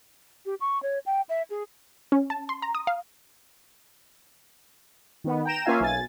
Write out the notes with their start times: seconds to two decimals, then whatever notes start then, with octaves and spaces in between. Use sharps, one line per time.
0.46 G4
0.61 C#6
0.83 C#5
1.06 G5
1.29 E5
1.50 G#4
2.12 C#4
2.30 A5
2.49 C6
2.62 A#5
2.75 D#6
2.87 F5
5.24 D#3 B3
5.45 G5 A#5 E7
5.65 A#3 C#4 F4 E5 F5 G#5
5.80 B1 G#5 A6